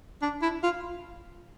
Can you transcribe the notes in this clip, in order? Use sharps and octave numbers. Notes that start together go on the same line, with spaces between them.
D4
E4
F4